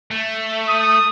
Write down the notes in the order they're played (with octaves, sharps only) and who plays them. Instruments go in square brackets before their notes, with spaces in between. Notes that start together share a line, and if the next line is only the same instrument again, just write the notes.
[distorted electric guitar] A3
[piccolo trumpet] D#6